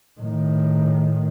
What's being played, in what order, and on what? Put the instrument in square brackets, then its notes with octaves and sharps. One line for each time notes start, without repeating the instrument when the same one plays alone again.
[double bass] A2 D#3